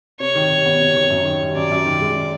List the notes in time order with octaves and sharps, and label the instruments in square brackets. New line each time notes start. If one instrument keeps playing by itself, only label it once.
[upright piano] C3 [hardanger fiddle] C#5
[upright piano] D#3
G3
B3
C3
D#3
F#2
D#3
G3
[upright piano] F#2 [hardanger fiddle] D5
[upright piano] F#2
D#3
G#3
C#4